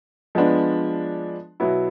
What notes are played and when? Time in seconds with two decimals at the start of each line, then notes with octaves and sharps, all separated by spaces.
0.35 F3 G#3 B3 D4
1.60 B2 F#3 B3 E4